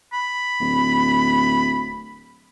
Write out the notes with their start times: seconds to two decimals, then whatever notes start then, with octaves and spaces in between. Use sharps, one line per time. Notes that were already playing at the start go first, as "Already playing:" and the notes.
0.13 B5
0.60 D1